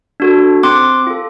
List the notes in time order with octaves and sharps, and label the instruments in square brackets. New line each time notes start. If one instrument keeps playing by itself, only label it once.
[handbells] D4 F#4 A4
C4 C6 D6
F4 A4